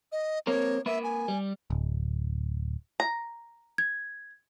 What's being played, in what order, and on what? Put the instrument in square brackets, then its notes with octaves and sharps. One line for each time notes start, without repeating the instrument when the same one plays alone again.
[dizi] D#5
[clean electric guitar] A#3 C4 A#4 [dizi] C#5
[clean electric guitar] A#3 B4 [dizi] E5
[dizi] G#5
[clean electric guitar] G3
[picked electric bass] D1
[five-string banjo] A#5
[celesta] G#6